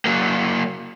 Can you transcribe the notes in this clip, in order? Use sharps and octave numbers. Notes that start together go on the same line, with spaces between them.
F#3 A#3